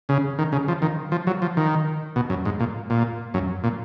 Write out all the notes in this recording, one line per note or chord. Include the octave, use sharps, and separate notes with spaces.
C#3
D#3
C#3
F3
D#3
F3
F#3
F3
D#3
B2
F#2
G#2
A#2
A#2
F#2
A#2